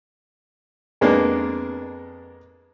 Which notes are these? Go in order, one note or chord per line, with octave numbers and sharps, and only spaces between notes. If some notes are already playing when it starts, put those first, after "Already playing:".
F2 G#3 A#3 B3 D4